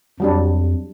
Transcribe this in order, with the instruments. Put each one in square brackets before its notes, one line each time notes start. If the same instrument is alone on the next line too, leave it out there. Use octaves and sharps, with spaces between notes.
[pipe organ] F2 [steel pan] F#3 G3 D4